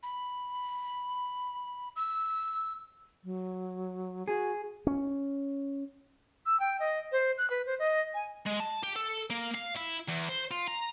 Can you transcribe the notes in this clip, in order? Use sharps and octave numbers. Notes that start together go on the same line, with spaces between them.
B5
E6
F#3
F#4 G#4
C#4
E6
G5
D#5
C5
F#6
B4
C5
D#5
G#5
G#3
A5
G4
A4
A#3
F5
E4
E2
C5
F4
A#5